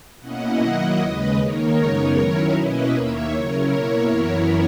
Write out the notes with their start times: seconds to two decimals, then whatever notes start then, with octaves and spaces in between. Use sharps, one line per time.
0.20 B2 A#3 C#4 E4 D#5 F#5
0.59 D#3 F#3 A#3 E4
0.98 D#2 C#3 G#3 B4 D#5
1.37 D#3 A#3 D#4 A#4 C#5
1.76 F#2 C#3 G#3 B3 D#4
2.15 D#3 F#3 C#4 E4
2.53 B2 A#3 C#4 E4 B4 D#5
2.93 D#2 D#3 A#3 C#5 E5
3.31 C#3 F#3 C#4 E4 A#4 C#5
3.71 B2 A#3 E4
4.09 F#2 E3 B3 E4